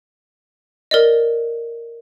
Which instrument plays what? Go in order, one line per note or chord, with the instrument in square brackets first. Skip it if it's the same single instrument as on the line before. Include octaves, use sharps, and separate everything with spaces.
[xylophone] A#4 D5 D#5